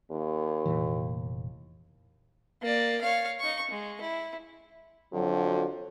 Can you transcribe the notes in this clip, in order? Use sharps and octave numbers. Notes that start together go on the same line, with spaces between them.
D#2
F1 A#2 E3
A#3 D5
C#5 F5
D#4 C#6
G#3
E4
F2 D3 F#3